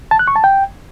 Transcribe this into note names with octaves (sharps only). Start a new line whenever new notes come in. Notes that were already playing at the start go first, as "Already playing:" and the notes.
A5
F#6
C#6
A5
G5